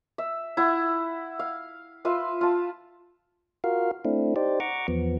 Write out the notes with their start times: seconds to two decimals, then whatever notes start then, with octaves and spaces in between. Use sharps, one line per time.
0.18 E5
0.57 E4 F#5
1.39 F5
2.05 F4 B4 E5 C6
2.41 F4 A5
3.64 F4 F#4 A#4 F5
4.05 A3 C4 D4 E4
4.36 D#4 G4 C5 D5
4.60 F#5 A#5 C#6 D6
4.88 E2 F3 B3